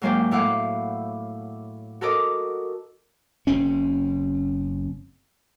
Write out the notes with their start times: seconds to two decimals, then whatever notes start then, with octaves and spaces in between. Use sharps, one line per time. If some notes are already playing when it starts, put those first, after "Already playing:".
0.02 G#2 F#3 A#3 C5 D5 G5
0.31 A2 E4 F5 F#5 D6
2.01 F#4 A4 A#4 D#5 D6
3.47 F#1 C4 C#4